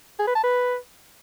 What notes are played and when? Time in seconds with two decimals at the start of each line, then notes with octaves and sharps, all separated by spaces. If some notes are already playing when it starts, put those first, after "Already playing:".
0.19 G#4
0.27 B4
0.35 A5
0.43 B4